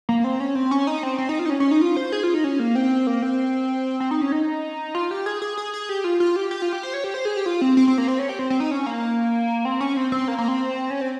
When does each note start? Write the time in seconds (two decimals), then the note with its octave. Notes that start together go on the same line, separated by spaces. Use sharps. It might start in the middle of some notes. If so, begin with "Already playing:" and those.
0.09 A#3
0.24 C4
0.40 C#4
0.55 C4
0.71 C#4
0.87 D#4
1.03 C4
1.18 C4
1.29 D#4
1.39 F4
1.46 D#4
1.50 C#4
1.60 C#4
1.71 D#4
1.82 F4
1.97 C5
2.12 G#4
2.23 F4
2.34 D#4
2.44 C#4
2.59 A#3
2.75 C4
3.07 A#3
3.22 C4
4.00 C4
4.11 D#4
4.21 C#4
4.32 D#4
4.95 F4
5.11 G4
5.26 G#4
5.42 G#4
5.58 G#4
5.74 G#4
5.89 G4
6.04 F4
6.20 F4
6.36 G4
6.51 G4
6.62 F4
6.73 G4
6.83 C5
6.94 C#5
7.04 G4
7.14 C5
7.25 G#4
7.37 G4
7.46 F4
7.61 C4
7.77 C4
7.88 C4
7.98 A#3
8.08 C4
8.19 C#4
8.29 G4
8.39 C4
8.50 C4
8.60 D#4
8.71 C#4
8.86 A#3
9.65 C4
9.81 C#4
9.97 C4
10.12 C4
10.28 A#3
10.38 A#3
10.48 C4
10.90 C#4
11.01 C4